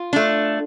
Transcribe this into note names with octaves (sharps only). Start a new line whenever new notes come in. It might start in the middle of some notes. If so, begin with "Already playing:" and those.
Already playing: F4
A3 D4